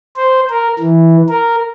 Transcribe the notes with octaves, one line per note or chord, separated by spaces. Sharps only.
C5
A#4
E3
A#4